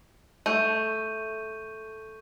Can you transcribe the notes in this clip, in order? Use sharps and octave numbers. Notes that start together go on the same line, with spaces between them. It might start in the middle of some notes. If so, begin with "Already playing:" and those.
A3 C#6 G6 D#7